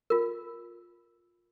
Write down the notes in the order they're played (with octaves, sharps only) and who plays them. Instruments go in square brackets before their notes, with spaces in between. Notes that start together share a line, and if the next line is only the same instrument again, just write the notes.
[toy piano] F4 A#4